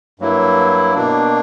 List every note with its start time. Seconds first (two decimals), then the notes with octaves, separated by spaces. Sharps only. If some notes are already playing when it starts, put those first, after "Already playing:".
0.19 G2 F#3 A#3 E4
0.95 B2 A#3 D4